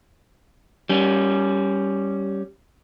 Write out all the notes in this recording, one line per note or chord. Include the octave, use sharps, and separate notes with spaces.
G3 C#4